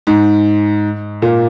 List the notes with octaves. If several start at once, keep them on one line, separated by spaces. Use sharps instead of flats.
G#2
A#2